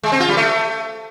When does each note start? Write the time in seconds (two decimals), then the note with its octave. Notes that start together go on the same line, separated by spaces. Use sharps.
0.03 G#3
0.12 C4
0.20 F4
0.28 G3
0.37 A3